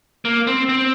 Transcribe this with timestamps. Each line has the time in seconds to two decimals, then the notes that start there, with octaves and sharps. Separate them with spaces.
0.25 A#3
0.47 C4
0.69 C4